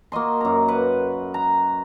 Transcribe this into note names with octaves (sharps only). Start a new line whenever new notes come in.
A#3 F#4 D#5 C6
F#2 A#5
B4 F#5
A#5